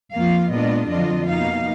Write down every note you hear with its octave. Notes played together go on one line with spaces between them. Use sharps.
F2 F3 A#3 F4 F5
A#2 G#3 B3 D4 F4 D#5
F2 D3 F#3 D4 F4 D#5
B2 A#3 D#4 F5